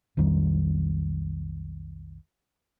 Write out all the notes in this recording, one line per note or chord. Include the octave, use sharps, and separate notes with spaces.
B1 F2 D#3 G3